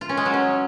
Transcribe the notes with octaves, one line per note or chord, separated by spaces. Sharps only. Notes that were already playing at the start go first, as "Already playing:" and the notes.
F4
C#4
G#3
F#3
C#4